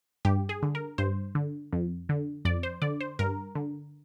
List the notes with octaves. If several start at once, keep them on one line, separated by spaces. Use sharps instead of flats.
G2 G4
G#4
D3
A#4
G2 C5
D3
F2
D3
F2 D5
C5
D3 D5
C5
G2 A#4
D3